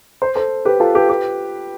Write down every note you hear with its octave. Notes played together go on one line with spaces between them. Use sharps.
C5
A4 C5
G4 B4
F4 A4
G4 B4
G4 B4